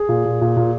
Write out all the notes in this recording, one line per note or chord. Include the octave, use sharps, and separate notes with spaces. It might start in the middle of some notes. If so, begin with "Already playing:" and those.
Already playing: G#4
A#2
A#2
A#2
A#2